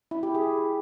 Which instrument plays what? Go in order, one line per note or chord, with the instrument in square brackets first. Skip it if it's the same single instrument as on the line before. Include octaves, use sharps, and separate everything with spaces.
[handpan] E4
G4
G#4